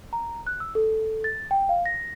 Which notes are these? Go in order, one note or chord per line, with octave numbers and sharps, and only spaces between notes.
A#5
F#6
E6
A4
A6
G5
F5
A#6